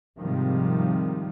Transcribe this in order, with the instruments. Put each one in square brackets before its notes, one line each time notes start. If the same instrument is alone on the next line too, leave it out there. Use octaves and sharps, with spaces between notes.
[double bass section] G#2 C3 D#3 F3 G3